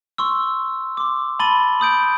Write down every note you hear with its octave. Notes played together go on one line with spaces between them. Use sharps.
C6 C#6 E6
C6 D6
A5 B5 C6 A6 D#7 G7
B5 D#6 G6 D7